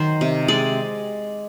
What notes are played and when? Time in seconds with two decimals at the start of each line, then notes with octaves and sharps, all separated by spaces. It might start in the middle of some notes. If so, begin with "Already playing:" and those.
Already playing: D#3 F#3 C5
0.21 C3
0.48 G#3 D5